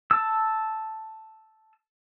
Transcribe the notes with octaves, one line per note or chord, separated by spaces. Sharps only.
A5 E6